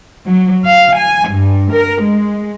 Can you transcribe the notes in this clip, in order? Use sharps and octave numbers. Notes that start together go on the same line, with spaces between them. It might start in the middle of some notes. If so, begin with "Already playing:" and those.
F#3
F5
G#5
G2
A#4
G#3